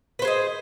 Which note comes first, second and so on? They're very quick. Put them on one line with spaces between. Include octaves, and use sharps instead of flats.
B4 C5 G#4 D#5